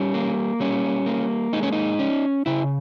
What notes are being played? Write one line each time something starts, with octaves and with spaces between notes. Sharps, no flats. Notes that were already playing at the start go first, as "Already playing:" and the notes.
Already playing: G3 C#4
A#3
G3 C#4
A#3
G#3 D#4
C#4
D#4
C#4
C#3 E4